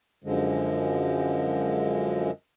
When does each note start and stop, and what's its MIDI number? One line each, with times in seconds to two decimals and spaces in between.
0.24 2.31 42
0.24 2.31 50
0.24 2.31 53
0.24 2.31 56